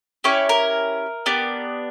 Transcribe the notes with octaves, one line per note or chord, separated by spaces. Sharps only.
C#4 E4 G4 C#5
A#4
B3 D4 G4